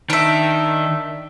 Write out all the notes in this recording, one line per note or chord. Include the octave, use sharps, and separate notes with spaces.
D#3 D4 E5